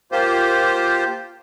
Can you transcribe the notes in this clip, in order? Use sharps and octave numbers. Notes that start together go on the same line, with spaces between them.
A#3 F4 G4 C5